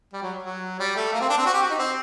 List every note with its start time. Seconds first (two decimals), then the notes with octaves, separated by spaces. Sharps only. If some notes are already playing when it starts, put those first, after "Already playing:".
0.13 G3
0.22 F#3
0.43 F#3
0.80 G3
0.96 A3
1.13 A#3
1.21 C4
1.30 D4
1.38 C4
1.46 F#4
1.54 G4
1.62 F#4
1.70 D#4
1.79 C4